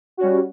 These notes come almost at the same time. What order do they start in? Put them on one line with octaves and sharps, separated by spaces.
F#4 C#4 G3